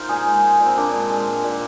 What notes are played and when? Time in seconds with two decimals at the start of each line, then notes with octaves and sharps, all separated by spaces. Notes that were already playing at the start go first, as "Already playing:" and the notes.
Already playing: D#4 F4 A#4 C5
0.09 A#2 G#4
0.26 G#3
0.43 G#3
0.60 A#2
0.66 C4
0.77 A#2 D4
0.93 G#3
1.10 G#3
1.28 A#2
1.44 A#2